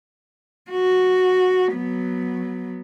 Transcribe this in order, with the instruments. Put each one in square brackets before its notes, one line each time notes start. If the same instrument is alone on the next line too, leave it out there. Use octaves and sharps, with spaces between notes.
[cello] F#4
F#3 B3